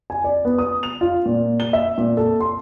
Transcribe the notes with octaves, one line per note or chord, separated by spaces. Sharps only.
G#5
D5
B3
D#6
F7
F4
A#2
G7
E5
A#2
A4
C6